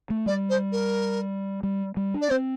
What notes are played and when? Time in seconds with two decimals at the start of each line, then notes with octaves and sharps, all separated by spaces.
0.10 A3
0.26 G3 D5
0.50 C5
0.72 A#4
1.63 G3
1.97 G3
2.14 D4
2.22 D5
2.30 C4 C5